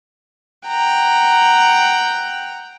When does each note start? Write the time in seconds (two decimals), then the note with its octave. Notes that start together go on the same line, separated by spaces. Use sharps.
0.68 F#5 G5 A#5